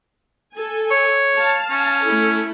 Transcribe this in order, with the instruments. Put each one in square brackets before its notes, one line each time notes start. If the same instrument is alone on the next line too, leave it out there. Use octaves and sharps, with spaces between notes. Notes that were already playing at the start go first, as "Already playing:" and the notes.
[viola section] A4 G#5
[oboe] C#5
[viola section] F5 A5
[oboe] C#4
[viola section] A3 E4 A4